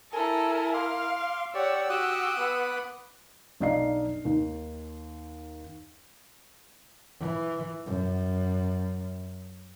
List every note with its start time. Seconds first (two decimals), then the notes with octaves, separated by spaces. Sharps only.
0.13 E4 A4 A#4 G#5
0.74 F5 C6 D6
1.54 G4 C#5 D5 F#5 E6
1.90 F#4 G4 D6 D#6 F#6
2.37 B3 B5
3.60 B1 D4 D#5 F5 A#5 C7
4.25 D#2 D#3 D#4
7.20 E3
7.86 F#2